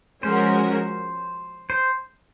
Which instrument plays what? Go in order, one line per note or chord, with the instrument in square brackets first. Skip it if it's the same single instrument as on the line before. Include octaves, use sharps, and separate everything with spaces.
[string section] F3 G#3 C#4 F#4 A#4 [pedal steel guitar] C5
[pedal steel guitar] C5